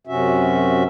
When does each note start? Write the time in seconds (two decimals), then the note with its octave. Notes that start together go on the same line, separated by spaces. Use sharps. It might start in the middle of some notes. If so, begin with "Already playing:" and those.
0.07 F#2 C3 C#4 F#4 E5